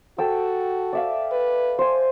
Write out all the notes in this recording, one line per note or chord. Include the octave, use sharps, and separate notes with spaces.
F#4 A4 G5 E6
D5 E5 F5
B4
C5 G#5